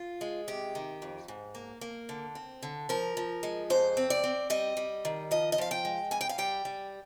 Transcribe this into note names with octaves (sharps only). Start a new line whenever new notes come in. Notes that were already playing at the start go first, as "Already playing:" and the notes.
Already playing: F4
G#3
C3 G4
D#3
F2
G#2
A#3
A#3
D3
C4
D3
F3 A#4
F3
G#3
F2 C5
C4
D5
C4
G3 D#5
G3
D#3
F3 D#5
D#5
F3 F5
G5
G#3
G2 G#5
G5
F5
G3 G5
G3